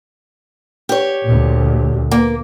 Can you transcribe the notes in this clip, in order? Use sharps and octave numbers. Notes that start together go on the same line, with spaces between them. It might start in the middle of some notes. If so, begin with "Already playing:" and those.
G4 C#5
D2 A#2
A#3